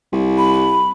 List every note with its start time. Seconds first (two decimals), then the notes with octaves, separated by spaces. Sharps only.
0.12 C2
0.38 B5